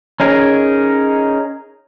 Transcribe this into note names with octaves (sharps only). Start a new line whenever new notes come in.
C#4 D#4 G#4 A#4